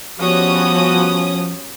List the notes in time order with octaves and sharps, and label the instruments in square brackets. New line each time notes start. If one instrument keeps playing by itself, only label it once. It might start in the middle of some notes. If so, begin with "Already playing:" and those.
[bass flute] F3 [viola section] G3 B3 F#4 [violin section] C#4 D#6